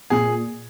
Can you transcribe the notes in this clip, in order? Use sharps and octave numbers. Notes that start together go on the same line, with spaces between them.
A#2 G#4